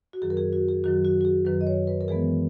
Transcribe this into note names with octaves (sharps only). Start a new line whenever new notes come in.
F#4
F#2 D#3 F#3 G#4
A#4
G#4
F#4
G#4
F#2 D#3 F#3 F#4
F#4
F#4
G#4
F#2 D#3 F#3 B4
D#5
C#5
B4
A#4
F#2 E3 G#3 B3 G#4